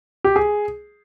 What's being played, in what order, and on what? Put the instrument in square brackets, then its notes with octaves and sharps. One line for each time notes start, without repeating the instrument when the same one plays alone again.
[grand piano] G4
G#4